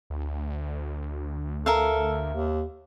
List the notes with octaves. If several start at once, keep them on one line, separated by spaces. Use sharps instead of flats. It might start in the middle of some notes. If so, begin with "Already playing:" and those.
D2
A4 A#4 E5 F5
D#2